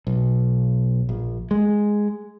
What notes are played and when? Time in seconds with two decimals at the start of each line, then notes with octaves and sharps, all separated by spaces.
0.07 B1
1.09 A#1
1.51 G#3